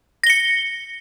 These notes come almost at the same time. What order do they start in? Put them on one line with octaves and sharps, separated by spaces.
A#6 G7 C#7